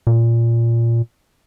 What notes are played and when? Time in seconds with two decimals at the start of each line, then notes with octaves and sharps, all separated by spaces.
0.07 A#2